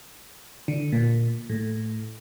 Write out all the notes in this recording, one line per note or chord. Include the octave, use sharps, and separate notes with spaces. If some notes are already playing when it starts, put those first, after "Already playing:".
D3
A#2
A2